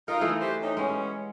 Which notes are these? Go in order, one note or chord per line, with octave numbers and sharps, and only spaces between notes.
D#4 F4 A#4
E3 A3
F#4 G4 C5
C3 C#4 D#4
G3 G#3 B3 C#4